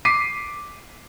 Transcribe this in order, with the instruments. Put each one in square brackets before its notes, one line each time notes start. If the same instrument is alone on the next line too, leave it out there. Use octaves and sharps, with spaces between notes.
[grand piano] D6 B6 C7 D#7